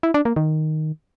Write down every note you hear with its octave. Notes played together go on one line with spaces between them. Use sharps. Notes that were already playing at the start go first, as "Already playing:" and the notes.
E4
D4
A#3
D#3